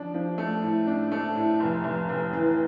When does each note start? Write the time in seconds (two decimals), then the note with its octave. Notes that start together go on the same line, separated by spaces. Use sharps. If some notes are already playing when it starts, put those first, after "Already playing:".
Already playing: F3 D4
0.14 F3
0.38 A3
0.62 A2
0.87 D4
1.12 A3
1.35 A2
1.60 F1
1.84 F1
2.09 F1
2.33 E3